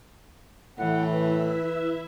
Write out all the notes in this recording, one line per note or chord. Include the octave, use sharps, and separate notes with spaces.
A2 E3 E4 A4 F#5 G5
E4 B4 E5